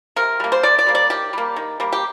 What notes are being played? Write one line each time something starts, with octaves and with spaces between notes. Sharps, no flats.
C3 A#4
G3 A#3
C5
C3 D5
D5
G3 A#3
D5
D#3 G4
G3 A#3
D#3
G3 A#3
G4